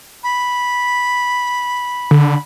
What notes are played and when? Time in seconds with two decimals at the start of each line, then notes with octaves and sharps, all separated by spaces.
0.24 B5
2.11 D3